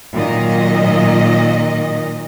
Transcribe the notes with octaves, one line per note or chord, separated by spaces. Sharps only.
A#2 D#3 F#3 D#5